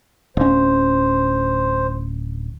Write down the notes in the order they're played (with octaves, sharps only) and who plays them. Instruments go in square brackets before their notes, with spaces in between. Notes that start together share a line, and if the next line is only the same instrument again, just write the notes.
[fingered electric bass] D1 C#4 [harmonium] C5